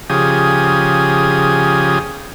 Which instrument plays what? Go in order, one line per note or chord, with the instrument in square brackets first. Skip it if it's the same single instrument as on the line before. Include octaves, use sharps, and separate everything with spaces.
[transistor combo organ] C#3 F3 G4 G#4 D#6